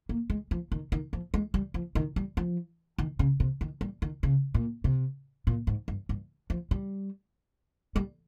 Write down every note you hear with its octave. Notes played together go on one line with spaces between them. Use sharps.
A#3
G#3
F3
D#3
D#3
F3
G#3
G3
F3
D#3
G3
F3
D#3
C#3
C3
D#3
G3
D#3
C#3
A#2
C3
A#2
G#2
G2
G2
F3
G3
G3